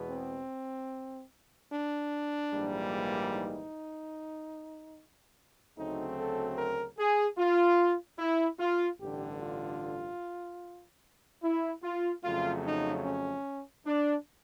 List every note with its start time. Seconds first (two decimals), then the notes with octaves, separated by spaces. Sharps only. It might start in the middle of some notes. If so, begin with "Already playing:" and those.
Already playing: E2 B2 G#3 B3
0.09 C4
1.72 D4
2.53 A#1 G#2 E3 G3 A#3
3.34 D#4
5.77 D2 C#3 F#3 A3 C4 D#4
6.17 A4
6.58 A#4
6.98 G#4
7.38 F4
8.19 E4
8.60 F4
9.00 A1 G2 D3 G4
9.40 F4
11.43 E4
11.83 F4
12.23 F2 C#3 F#3 A3 F4
12.65 D#4
13.04 C#4
13.86 D4